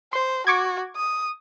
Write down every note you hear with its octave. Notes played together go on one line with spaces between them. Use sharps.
C5 C6
F#4 C#6 D6 G#6
D#6